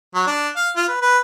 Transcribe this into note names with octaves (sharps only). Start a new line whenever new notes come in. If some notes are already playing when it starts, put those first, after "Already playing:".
F#3
D4
F5
F4
B4
B4